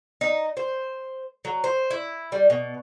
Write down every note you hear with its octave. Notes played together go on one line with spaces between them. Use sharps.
D#4
C5
F#3
C5
E4
G3
B2